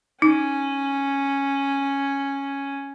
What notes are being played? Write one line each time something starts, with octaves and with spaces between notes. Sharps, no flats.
C#4 D#4